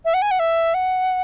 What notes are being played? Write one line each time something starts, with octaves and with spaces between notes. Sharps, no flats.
E5
F#5
G#5
F#5
E5
F#5